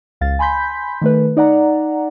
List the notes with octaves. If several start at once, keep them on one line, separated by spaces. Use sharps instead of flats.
C#2 F5 A6
G#5 B5 C6 G6 B6
D#3 A3 B4
D#4 D5 F#5 A#5